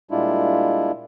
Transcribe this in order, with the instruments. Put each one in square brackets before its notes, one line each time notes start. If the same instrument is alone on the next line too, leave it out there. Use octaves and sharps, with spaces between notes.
[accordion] A#2 G3 G#3 D4 E4 F4